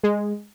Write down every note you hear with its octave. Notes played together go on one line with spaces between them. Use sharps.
G#3